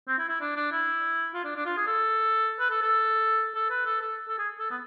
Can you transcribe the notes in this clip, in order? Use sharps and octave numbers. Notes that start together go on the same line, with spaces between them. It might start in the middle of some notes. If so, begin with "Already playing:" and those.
C4
E4
E4
D4
D4
E4
F4
D4
D4
F4
G#4
A4
B4
A4
A4
A4
B4
A4
A4
A4
G#4
A4
B3